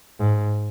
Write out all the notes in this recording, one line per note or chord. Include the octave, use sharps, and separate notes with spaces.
G#2